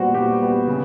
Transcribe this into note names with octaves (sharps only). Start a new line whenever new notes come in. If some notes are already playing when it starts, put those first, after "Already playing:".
Already playing: A#2 G3 B3 F#4 C5
A#2 G4
G3 B3
C#3